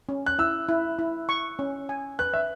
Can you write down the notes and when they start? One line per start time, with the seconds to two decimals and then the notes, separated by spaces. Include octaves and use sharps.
0.09 C#4
0.26 F#6
0.39 E4 E6
0.69 E4
0.99 E4
1.29 C#6
1.59 C#4
1.89 G#5
2.19 B4 F#6
2.34 E5